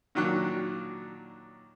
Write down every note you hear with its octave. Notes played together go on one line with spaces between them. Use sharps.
A#2 D#3 F#3 D4 F#6